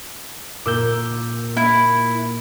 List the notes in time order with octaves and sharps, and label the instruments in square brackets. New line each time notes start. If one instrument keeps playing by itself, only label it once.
[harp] A#2 [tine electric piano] D6 E6 G6
[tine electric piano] A#3 [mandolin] E4